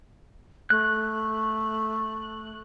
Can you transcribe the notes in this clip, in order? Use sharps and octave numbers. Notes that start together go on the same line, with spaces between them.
A3 F#6